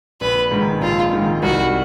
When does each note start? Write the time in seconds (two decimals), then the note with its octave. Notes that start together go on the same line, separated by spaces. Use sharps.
0.21 A#1 B4
0.51 G#2 D#3
0.82 A#1 F4
1.13 G#2 D#3
1.43 C2 F#4